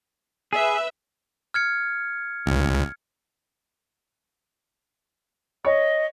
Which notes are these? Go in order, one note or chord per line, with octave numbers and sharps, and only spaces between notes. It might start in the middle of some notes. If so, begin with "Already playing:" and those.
G#4 B4 E5
F6 G#6 C#7
C#2
C#5 D#5